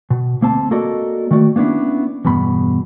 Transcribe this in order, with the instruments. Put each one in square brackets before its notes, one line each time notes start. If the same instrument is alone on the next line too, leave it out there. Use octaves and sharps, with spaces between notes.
[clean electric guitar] B2
D2 A#3 C4 A5
A#3 F#4 A4 A#4 D5 D#5
D#3 A3 F#4 D5
A#3 B3 C#4 D4 E4
E2 G2 B2 B5